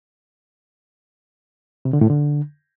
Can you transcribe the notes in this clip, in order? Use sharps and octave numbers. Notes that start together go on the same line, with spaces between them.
C3
D3
A2
D3